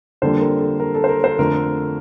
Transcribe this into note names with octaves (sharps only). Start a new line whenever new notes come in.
F2 D3 G3 A#3 D4 A4 C5
A#4
A4
A#4
A4
C5
A#4
A4 C5
F2 D3 A3 A#4